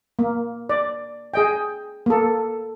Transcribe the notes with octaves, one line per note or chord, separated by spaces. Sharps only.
A#3
D5
G#4 D#5 G5
A#3 A4